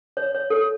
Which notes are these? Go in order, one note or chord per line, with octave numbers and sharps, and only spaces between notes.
C#5
C#5
A4